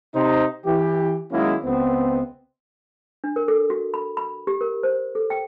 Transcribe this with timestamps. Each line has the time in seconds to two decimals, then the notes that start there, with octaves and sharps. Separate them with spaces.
0.14 C3 D#4 C5
0.65 E3 G4
1.32 D#3 F#3 G#3 A#3 C#4 E4
1.63 C#2 B3 C4
3.24 D4
3.36 A#4
3.48 A4
3.70 F#4
3.94 B5
4.17 B5
4.47 G4
4.61 A#4
4.83 C5
5.15 A4
5.30 G5